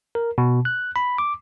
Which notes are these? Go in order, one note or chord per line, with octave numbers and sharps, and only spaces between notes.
A#4
B2
F#6
B5
D6